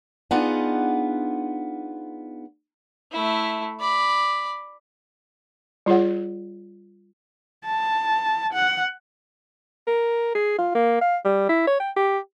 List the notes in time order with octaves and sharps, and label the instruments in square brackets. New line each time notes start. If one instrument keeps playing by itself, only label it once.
[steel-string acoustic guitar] B3 D4 D#4 F4 G#4 F#5
[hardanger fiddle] A3 E4
D5 B5
[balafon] G3 F4 G#4 C#5 F#5
[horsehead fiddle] A5
F#5
[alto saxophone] A#4
G#4
F4
A#3
F5
G3
E4
C#5
G5
G4